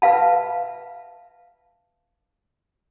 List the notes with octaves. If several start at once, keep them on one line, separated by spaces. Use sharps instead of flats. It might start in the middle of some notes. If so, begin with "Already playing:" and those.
B4 E5 F5 A5